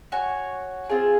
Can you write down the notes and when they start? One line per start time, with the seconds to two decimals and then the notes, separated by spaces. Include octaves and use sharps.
0.12 F#4 C#5 G#5
0.90 C4 F4 G#4